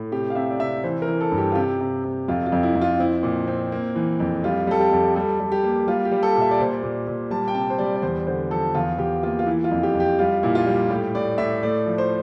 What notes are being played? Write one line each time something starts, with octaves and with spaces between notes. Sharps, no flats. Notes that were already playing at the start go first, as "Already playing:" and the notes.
Already playing: A2
C3 G4
F5
C3 E5
D5
C3 E5
E3 C5
A#4
E3
A4
G2
G4
F4
C3 G4
C3
C3
F2 F4
F4
F2
E4
F2
F4
C4 E4
A#2
C4
A#3
E3
F2
G3 F4
G3 A4
G4
F2
G3 A4
G3
G4
A#3
G3 F4
G4
G3
A4
A#2
E5
D5
A#2 C5
D5
A#2
A#2
G3 A5
G5
C3 A5
C5
G3 D5
D5
E2 C5
D3 C5
F3 A4
E2 F4
E2 G4
A#3 F4
F4
E3 E4
F4
F2
G4
F2
G4
G3 F4
A#2 E4
F4
G3
A2 G4
A2 D5
A2 E5
A3 D5
F3
C5